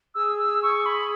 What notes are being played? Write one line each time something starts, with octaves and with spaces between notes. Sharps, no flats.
G#4 E6
E6
C#6
B5